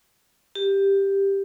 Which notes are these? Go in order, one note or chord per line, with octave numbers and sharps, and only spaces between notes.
G4